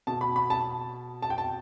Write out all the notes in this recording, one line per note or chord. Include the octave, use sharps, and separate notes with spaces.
B2 A5
B5
B5
A5
A5
G5
A5